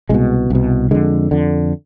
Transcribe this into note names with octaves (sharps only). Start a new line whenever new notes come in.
C2 B2 G#3
C2 B2
F2 D3 G#3
F2 D3